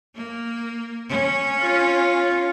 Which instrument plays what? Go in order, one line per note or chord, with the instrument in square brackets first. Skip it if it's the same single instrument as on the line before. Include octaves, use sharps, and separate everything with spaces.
[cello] A#3
C#4
[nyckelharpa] F4